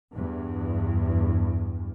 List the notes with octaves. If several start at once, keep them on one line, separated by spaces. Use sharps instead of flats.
E2 G2